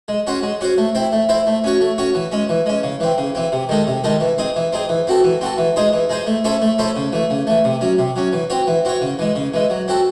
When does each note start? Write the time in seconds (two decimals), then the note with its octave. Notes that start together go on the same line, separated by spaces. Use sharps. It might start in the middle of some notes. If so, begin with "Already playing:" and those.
0.08 G#3
0.27 C#4 F#4 C5
0.43 G#3
0.61 C#4 F#4 C5
0.78 A3
0.95 C4 E4 C5
1.12 A3
1.29 C4 E4 C5
1.47 A3
1.64 C#4 F#4 C#5
1.81 A3
1.98 C#4 F#4 C#5
2.14 E3
2.32 G#3 C#4
2.49 E3
2.66 G#3 C#4
2.83 C#3
3.00 E3 C4
3.18 C#3
3.35 E3 C4
3.52 C3
3.69 D#3 G#3 D#4 A4
3.87 C3
4.04 D#3 G#3 D#4 A4
4.20 E3
4.38 C4 D#4 G#4
4.56 E3
4.73 C4 D#4 G#4
4.89 E3
5.07 C4 F#4 A4
5.24 E3
5.41 C4 F#4 A4
5.58 E3
5.76 G#3 D#4 G#4 C5
5.93 E3
6.09 G#3 D#4 G#4 C5
6.27 A3
6.44 C#4 E4 A4 C5
6.62 A3
6.78 C#4 E4 A4 C5
6.96 C#3
7.13 E3 A3
7.30 C#3
7.47 E3 A3
7.64 C3
7.81 F#3 C#4
7.98 C3
8.16 F#3 C#4
8.33 E3
8.50 C4 F#4 C#5
8.67 E3
8.85 C4 F#4 C#5
9.01 C#3
9.19 E3 G#3
9.36 C#3
9.54 E3 G#3
9.70 F#3
9.88 C4 F#4 A4